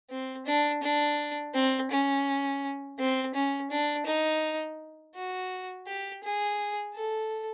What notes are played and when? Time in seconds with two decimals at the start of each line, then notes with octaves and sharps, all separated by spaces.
0.10 C4
0.46 D4
0.83 D4
1.54 C4
1.90 C#4
2.99 C4
3.35 C#4
3.71 D4
4.06 D#4
5.15 F#4
5.87 G4
6.23 G#4
6.95 A4